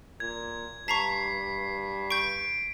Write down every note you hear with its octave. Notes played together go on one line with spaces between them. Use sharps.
A#2 G#6
G2 A5 A#5 C#6 B6 C7
C#6 G6 D7